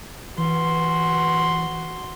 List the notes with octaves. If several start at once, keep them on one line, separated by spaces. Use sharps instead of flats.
E3 F#4 C6